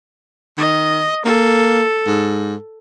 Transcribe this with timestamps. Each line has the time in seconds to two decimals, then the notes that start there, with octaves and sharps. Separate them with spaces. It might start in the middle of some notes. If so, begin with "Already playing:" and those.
0.58 D#3 D#5
1.25 A#3 A4
2.06 G#2